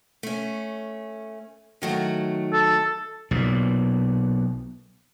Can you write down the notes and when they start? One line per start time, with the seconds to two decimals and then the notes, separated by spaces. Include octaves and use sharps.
0.23 A3 C#4
1.82 D#3 F#3 A3
2.53 A4
3.31 B1 A#2